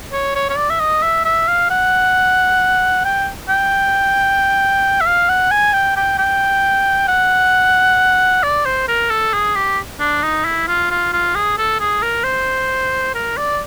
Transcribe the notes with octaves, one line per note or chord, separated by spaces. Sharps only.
C#5
C#5
C#5
D5
E5
D#5
E5
E5
F5
F#5
G5
G5
E5
F5
F#5
G#5
G5
G5
G5
F#5
D5
C5
A#4
A4
G#4
G4
D4
D#4
E4
F4
F4
F4
G#4
A4
G#4
A#4
C5
A#4
D5